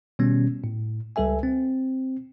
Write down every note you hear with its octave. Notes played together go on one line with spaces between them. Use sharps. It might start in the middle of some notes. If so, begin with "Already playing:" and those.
B2 D#3 G3 B3 C#4
A2
C#2 G3 A4 E5 G#5
C4